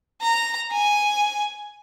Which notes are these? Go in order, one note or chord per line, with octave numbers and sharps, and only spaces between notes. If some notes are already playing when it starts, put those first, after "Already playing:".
A#5
G#5